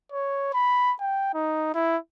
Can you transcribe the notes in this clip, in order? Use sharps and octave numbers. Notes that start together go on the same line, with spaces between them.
C#5
B5
G5
D#4
E4